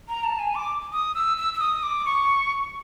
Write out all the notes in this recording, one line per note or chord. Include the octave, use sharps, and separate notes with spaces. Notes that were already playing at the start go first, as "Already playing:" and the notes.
A#5
A5
G#5
D6
D#6
E6
E6
E6
D#6
D6
C#6